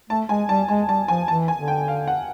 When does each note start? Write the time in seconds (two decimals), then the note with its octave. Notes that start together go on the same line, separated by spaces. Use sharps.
0.10 A3 A5
0.29 G#3 G#5
0.49 G3 A5
0.68 G#3 G#5
0.88 G3 A5
1.08 F3 G#5
1.28 E3 A5
1.48 G#5
1.58 D3
1.68 G5
1.88 F5
2.08 F#5